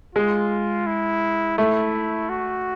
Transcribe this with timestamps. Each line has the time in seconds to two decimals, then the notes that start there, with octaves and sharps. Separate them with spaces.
0.15 G#3 F4
0.87 E4
1.58 A3 E4
2.29 F#4